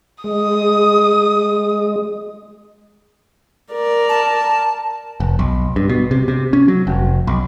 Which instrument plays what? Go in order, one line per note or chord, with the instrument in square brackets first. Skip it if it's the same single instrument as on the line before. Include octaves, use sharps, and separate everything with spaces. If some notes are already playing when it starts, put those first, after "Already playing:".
[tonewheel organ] G#3 [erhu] D#6
[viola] A#4 D5
[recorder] A5
[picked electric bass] F1
B1
G2
B2
C3
C3
C#4
F#3
F1
B1